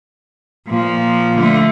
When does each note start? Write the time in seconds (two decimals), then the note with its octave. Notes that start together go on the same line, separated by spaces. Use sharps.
0.67 A#2 F3
1.38 D3 A3